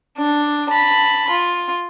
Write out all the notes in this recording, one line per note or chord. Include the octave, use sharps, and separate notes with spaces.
D4
A5 B5
F4